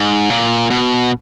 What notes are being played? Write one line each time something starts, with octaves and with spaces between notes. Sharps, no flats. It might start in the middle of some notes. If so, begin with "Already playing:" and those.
Already playing: G#2
A#2
B2